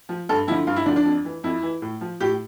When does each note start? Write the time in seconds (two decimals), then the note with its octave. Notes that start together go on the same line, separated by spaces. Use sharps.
0.09 F3
0.29 G2 A4
0.47 F3 E4
0.51 D3
0.67 G2 F4
0.76 E4
0.86 D3 F3 D4
0.96 D4
1.05 F2
1.25 E3
1.44 F2 E4
1.62 E3
1.82 A2
2.01 F3
2.20 A2 G4